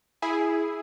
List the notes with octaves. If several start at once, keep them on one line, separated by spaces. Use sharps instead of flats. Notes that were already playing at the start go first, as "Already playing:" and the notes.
E4 G#4